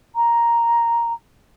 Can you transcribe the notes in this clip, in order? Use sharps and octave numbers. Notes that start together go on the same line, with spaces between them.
A#5